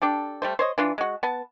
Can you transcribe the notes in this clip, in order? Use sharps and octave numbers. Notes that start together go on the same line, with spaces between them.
D4 G4 A4
G3 A3 C5
C5 C#5 D#5
E3 D4 F4
G#3 F#4
B3 A5